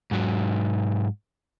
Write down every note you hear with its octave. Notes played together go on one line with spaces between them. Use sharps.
G#2 F#3